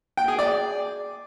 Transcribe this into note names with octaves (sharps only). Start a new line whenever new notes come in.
G5
G#4
D5